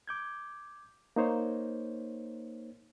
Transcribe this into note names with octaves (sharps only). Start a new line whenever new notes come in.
D6 G6 G#6
A#3 D#4 C5 C#5